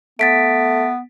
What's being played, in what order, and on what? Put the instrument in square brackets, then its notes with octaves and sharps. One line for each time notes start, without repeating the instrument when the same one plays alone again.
[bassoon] A3 [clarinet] B3 [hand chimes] A6 B6 D7